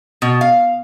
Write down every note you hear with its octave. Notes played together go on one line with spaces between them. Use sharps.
B2
F5